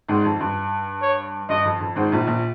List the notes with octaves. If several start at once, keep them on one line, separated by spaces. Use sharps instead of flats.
G#1 G#2
F2
G2
C#5
G2 D#5
F2
F2
G#1 G#2 C5
A#1 A#2
A#1 A#2